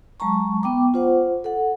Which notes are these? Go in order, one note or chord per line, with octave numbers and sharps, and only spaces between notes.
F#3 G#3 A5 A#5 C#6
B3 G5 D6
F4 C5 F#5
A4 F#5